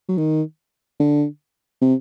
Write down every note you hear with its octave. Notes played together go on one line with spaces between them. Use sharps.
F#3
D#3
D3
C3